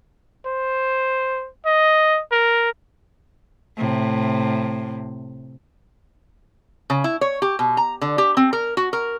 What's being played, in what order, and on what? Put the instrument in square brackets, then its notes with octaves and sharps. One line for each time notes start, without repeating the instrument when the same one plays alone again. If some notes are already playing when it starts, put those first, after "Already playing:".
[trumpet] C5
D#5
A#4
[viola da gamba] A2 C3
[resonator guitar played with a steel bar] C#3
E4
C#5
G4
B2
A#5
D3
G4
C4
A#4
F#4
A#4